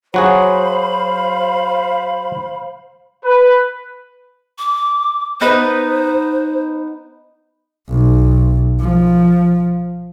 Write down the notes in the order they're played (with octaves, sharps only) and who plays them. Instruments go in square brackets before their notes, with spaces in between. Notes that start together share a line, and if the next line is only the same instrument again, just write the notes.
[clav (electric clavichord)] F#3 F#4 G#4 [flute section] C5 F5 B5
[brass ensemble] B4
[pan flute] D6
[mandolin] B3 D#4 B4 [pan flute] C5
[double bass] B1
F3